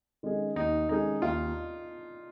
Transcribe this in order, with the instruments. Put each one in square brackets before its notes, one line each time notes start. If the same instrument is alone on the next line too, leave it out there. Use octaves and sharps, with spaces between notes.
[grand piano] D#3 G#3 C#4 G#4
[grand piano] D#2 [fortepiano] D#4
[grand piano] D#3 G#3 C#4 G#4 [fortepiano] D#4
[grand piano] D#2 [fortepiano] F4